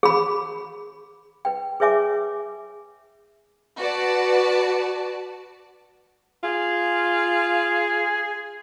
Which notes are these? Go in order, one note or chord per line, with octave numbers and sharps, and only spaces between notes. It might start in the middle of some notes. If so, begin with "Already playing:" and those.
G#4 B5
B4 G5
G#4 B4 C#5 E5 G#5 D6
F#4 B4 D5 A5
F4 G#4